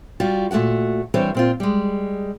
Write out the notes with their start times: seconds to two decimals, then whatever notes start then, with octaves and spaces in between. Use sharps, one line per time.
0.20 G3 F4 F#4
0.51 A#2 A3 D4 F#4 F#5
1.14 E3 G3 C4 D4 C5 C#5
1.34 A#2 C4 F4
1.60 G3 G#3